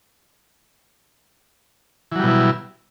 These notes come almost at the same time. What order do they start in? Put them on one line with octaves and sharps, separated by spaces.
E3 F#3 G3 B2 E4